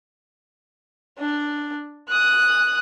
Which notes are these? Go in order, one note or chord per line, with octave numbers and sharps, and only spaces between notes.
D4
D#6 F#6